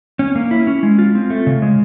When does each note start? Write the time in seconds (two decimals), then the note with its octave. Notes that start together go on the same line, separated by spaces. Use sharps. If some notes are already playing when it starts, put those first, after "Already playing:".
0.19 C#4
0.36 A#3
0.51 E4
0.67 C#4
0.83 G#3
0.99 F4
1.15 C4
1.30 A3
1.47 C#3
1.62 G#3